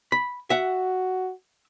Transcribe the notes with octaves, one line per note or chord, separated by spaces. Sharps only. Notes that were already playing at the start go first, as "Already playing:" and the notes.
B5
F#4 E5 F#5